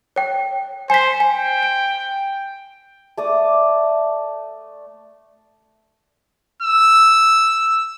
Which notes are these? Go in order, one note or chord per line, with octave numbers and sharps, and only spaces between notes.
C#5 G5
C5 G#5 B6
G5 G#5
D7
A3 D5 D6 D#6
E6